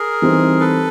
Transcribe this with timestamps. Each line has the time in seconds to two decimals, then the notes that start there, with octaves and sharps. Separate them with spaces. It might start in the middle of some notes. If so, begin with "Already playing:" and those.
Already playing: G#4 A#4
0.22 E3 G3 C4 D#4
0.60 A4 B4